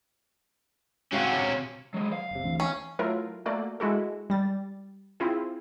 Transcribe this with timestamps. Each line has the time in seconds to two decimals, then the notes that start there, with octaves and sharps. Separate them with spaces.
1.12 C3 C#4 F#4 F5 F#5
1.94 F#3 G#3
2.13 F5
2.31 F#1 C3
2.44 D2 E3 C4
2.60 C#4
2.99 F#3 A3 E4 F4 A#4
3.46 A3 A#3 F#4 D5
3.80 G#3 E4 F#4 A4
4.30 G3 A6
5.20 C4 E4 F4 G#4